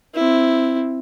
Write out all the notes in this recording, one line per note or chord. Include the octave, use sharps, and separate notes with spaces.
C4 E4